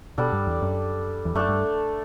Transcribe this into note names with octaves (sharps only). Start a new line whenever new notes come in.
B2 G3 D4 A4 D5
G2
E2
F#2
E2
F#2 A3 D4 A4
G2